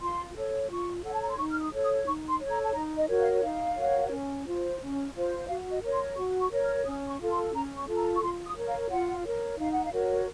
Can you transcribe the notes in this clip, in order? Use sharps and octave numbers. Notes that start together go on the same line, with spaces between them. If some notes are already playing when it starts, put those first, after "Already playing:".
F4 C6
A4 C#5
F4 C#6
A4 C#5 F#5
A5
A#5
C6
D#4 C#6
F6
D#6
A4 C#5
D#6
D#4 C#6
C6
A4 C#5
A#5
A5
D#4 A#5
D#5
F#4 A#4 C#5
F5
D#4 F5
F#4 A#4 C#5
C#4
F4 C5
C#4
F4 C5
F#4 F5
D#5
A#4 C#5
C6
F#4 C#6
C#6
A#4 C#5
F6
C#4 D#6
C#6
F4 A4
C6
C#4 A#5
C#6
F4 A4
A#5
C#6
F4 C6
D#6
A#4 C#5
F5
F4 F#5
A#4 C#5
D#4 F5
F#5
F5
F#4 A#4 C#5